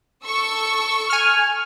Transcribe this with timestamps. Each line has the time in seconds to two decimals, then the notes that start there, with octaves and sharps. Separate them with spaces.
0.25 A4 C#6 E6
1.10 G#5 F6